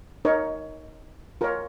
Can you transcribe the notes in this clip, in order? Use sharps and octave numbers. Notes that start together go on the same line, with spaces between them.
D#4 A#4 C#5
F4 A#4 C#5